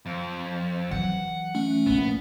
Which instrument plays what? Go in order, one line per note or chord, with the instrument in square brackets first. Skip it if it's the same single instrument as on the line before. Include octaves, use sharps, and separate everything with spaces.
[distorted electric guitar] F2
[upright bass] E3 F#3 [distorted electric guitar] F#5
[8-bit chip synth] A3 C#4
[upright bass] A#1 [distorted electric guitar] B3